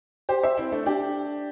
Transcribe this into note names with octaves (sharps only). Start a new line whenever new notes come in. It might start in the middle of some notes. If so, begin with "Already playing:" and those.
G4 C5
C5 E5
C4 E4
A3 D4
D4 G4